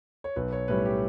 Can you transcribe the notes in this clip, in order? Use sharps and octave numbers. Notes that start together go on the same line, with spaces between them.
C#5
B1 B4
C#5
A2 G3 C#4 B4
G4